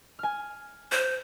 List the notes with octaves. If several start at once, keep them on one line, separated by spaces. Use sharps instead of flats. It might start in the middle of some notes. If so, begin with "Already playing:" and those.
G#5 F6
C5